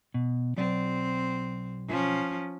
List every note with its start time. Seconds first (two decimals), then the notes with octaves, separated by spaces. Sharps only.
0.14 B2
0.57 B1 F#3 C4 D5
1.88 F3 C#4